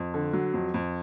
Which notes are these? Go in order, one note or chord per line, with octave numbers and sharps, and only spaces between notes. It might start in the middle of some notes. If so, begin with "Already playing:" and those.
Already playing: F2
D3
F#3
F2
F2